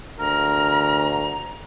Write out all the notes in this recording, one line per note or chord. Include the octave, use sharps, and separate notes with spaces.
D2 A#4 A#5